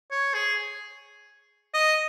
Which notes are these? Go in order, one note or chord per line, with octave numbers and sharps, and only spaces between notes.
C#5
G#4
D#5